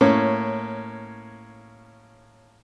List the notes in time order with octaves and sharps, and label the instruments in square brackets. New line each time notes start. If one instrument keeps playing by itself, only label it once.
[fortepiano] A2 A#3 C#4